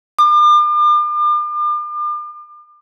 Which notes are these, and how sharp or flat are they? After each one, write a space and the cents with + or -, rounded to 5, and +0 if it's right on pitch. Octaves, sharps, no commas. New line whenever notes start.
D6 +40